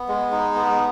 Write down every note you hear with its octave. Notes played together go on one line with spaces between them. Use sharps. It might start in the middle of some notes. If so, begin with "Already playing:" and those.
Already playing: B3
G#3
D#4
B3